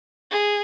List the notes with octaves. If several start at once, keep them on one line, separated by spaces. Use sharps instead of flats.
G#4